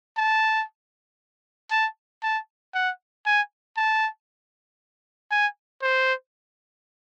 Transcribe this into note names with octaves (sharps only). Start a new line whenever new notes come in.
A5
A5
A5
F#5
G#5
A5
G#5
C5